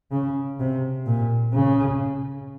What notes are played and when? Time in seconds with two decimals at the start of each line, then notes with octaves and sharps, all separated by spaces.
0.11 C#3
0.60 C3
1.06 A#2
1.53 C#3